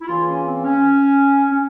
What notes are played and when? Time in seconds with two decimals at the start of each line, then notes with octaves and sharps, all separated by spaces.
0.01 E4
0.07 C#3 E3 A#3 F4
0.27 C#4
0.46 C4
0.64 C#4
1.51 C#4